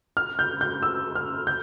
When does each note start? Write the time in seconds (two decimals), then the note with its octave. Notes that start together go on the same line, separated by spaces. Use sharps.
0.17 F6
0.39 G6
0.61 G6
0.83 E6
1.15 F6
1.47 G6